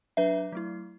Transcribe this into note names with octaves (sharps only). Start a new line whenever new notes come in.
F#3 D4 B4 E5
F#3 A3 E4